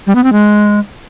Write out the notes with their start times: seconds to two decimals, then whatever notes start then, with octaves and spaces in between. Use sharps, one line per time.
0.07 G3
0.15 B3
0.24 C4
0.32 G#3